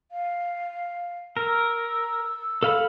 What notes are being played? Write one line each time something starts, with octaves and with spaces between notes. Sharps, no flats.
F5
A#4 E6
A4 F5 B5